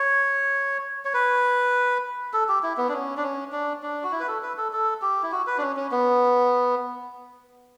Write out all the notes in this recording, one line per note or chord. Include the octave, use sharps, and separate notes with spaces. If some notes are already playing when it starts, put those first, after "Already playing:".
Already playing: C#5
C#5
B4
A4
G4
E4
B3
D4
C#4
D4
C#4
D4
D4
F#4
E4
B4
A4
B4
A4
A4
G4
E4
F#4
B4
D4
C#4
C#4
B3